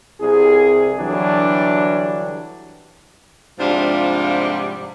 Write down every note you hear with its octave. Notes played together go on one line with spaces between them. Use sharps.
C2 G#4
D3 E3 F#3 G3 D4
G#2 C3 F3 G3 D4 F4